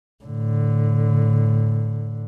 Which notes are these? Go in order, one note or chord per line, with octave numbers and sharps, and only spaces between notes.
A2 D3